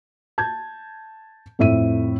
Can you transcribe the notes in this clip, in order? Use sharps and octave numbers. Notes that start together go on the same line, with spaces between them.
A5 G6 G#6
F2 A2 E5 D#7